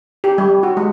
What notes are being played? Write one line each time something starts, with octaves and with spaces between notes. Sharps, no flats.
G4
G3
F#4
G#3